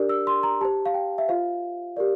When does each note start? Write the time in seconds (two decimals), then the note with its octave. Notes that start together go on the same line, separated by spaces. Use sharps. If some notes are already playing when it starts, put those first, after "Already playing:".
Already playing: D4 G4 A#4 D5
0.09 E6
0.27 C6
0.43 A#5
0.61 G4 C5 A5
0.86 F5
0.94 G5
1.18 E5
1.28 F4 C5 F5
1.97 G4 A#4 D5